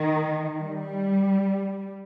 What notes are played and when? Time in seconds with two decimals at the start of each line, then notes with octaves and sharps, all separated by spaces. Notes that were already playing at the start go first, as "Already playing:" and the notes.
Already playing: D#3
0.62 G3